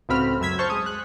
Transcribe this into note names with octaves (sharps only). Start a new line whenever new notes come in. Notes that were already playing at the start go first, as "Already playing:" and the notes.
C#2 A2 C4 F#4 B5 F6
F#2 E6 G#6 B6
C5 A5 C#6 F6 G6
G#3 D#6
F#6